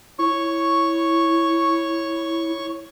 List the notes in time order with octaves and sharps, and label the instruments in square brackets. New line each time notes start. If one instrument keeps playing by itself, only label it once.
[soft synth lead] E4 [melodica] C#5 C#6